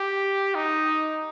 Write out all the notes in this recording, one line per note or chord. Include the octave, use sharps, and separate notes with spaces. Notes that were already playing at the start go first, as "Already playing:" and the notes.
Already playing: G4
D#4